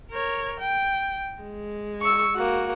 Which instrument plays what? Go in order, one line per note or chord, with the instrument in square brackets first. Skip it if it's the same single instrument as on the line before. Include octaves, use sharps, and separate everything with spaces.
[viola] A#4 C#5
G5
G#3
[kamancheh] C#6 E6
A#3 F#4